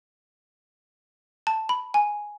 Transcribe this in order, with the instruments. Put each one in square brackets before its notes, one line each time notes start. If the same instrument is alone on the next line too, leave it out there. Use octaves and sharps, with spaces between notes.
[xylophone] A5
B5
G#5